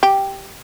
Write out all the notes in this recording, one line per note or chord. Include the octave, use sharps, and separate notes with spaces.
G4